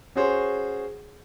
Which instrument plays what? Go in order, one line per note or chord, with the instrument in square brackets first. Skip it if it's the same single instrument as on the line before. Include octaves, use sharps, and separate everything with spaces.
[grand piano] C#4 F#4 G#4 C5 C#5